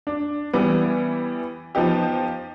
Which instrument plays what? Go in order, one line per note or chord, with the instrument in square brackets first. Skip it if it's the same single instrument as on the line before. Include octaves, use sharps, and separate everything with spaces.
[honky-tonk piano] D4
E3 G3 B3
F3 B3 D#4 G4